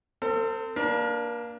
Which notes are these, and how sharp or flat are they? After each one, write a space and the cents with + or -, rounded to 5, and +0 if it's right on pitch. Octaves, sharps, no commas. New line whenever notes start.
C4 -15 A4 +40
A#3 +0 D4 +0 A#4 +40